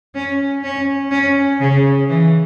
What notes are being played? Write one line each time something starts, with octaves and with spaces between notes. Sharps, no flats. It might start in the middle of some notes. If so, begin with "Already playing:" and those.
C#4
C#4
C#4
C#3
E3